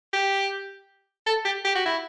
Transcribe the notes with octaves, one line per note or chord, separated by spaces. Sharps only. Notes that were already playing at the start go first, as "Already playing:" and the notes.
G4
A4
G4
G4
F#4
E4